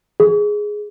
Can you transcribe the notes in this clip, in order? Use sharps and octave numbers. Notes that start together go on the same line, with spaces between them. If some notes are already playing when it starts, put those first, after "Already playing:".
G#4